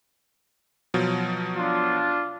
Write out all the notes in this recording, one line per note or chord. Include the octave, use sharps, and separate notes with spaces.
B2 F3 F#3
D4 F4